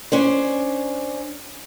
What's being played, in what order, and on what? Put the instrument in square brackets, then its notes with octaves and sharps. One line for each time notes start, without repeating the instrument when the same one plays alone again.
[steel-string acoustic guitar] C#4 D4 C5